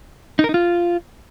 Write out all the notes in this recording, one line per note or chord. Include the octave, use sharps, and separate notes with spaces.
D#4
A#4
D#4
F4